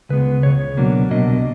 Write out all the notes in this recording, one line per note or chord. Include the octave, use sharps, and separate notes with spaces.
C#2 C#3 G#3 B3 B4
C#2 C#3 C#5
C2 B2 F#3 A#3 D4
C2 B2 F#3 A#3 D4 D#5